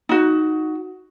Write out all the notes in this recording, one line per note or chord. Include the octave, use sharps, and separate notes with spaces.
D#4 F#4